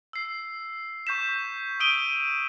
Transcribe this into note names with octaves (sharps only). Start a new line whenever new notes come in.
E6 C7
C#6 G6 B6 E7
D#6 E6 D7 D#7 G7